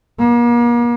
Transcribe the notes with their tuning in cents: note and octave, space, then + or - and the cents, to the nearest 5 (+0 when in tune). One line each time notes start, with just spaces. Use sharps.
A#3 +40